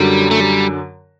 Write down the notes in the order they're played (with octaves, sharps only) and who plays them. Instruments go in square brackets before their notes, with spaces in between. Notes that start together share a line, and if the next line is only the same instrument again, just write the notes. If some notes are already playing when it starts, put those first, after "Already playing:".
Already playing: [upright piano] F#2 D3 F#3 [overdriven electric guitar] G3
[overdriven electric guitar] A3
G3